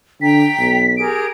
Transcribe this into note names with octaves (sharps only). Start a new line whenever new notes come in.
D3 G5 A#5 B6
B1
G4 G#4 A#4 D7